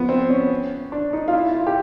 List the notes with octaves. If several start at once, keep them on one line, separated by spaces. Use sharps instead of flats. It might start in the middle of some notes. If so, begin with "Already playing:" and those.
Already playing: F3 B3
C4
C#4
D4
D#4
F4
E4
F4
G4